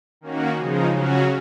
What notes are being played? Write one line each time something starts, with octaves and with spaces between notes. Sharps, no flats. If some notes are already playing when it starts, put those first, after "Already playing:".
D#3 A#3 C#4 F#4
C#3 F3 G#3 D#4
C#3 F#3 C#4 F#4